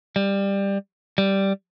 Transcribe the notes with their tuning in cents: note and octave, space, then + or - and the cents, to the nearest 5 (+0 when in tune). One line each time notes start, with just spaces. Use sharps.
G3 +15
G3 -5